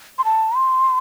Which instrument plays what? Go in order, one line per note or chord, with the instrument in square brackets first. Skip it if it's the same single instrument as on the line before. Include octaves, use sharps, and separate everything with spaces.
[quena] C6
A5
C6